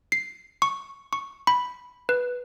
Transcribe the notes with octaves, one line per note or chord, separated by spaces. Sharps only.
C7
C#6
C#6
B5
B4